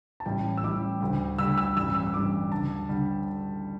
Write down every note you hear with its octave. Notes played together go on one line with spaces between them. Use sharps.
A5
A1 A2 G3 G5
E6
A1 A2 G3 D6
D2 D3 G3
D2 D3 G3 E6
E6
A1 G2 G3 E6
E6
E6
A1 G2 G3 D6
D2 D3 G3 A5
D3 G3